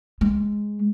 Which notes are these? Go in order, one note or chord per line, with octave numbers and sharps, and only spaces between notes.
G#3